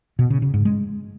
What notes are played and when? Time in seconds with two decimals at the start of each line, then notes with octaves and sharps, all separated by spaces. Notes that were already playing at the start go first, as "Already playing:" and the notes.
0.19 B2
0.30 C#3
0.42 C#3
0.54 G#2
0.65 G#3